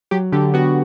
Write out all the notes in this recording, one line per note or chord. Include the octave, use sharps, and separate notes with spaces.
F#3 G4
D3 G4
B3 F#4